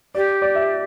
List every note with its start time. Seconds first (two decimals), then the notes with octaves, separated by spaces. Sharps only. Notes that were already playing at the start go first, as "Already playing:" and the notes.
0.15 G4 D5
0.42 D5
0.55 E5